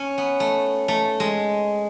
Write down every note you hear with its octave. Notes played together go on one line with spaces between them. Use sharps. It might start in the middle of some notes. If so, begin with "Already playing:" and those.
Already playing: C#4
B3
A3
A3
G#3